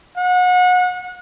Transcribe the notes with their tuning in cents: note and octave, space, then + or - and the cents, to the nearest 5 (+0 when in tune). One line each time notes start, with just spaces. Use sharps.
F#5 -30